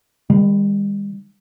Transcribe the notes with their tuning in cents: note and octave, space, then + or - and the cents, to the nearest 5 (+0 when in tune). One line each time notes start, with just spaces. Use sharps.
D#3 +0 G3 +40